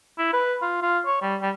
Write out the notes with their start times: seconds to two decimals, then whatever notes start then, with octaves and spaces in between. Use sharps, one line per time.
0.18 E4
0.33 B4
0.62 F4
0.82 F4
1.06 C#5
1.22 G3
1.42 G3